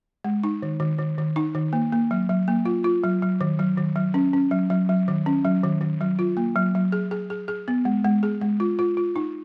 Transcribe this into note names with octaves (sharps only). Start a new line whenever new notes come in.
G#3
D#4
D#3
D#3
D#3
D#3
D#4
D#3
A#3
A#3
F#3
F#3
A#3
F4
F4
F#3
F#3
D#3
F#3
D#3
F#3
C#4
C#4
F#3
F#3
F#3
D#3
C#4
F#3
D#3
D#3
F#3
F4
A#3
F#3
F#3
G#4
G#4
G#4
G#4
B3
G#3
G#3
G#4
G#3
F4
F4
F4
D#4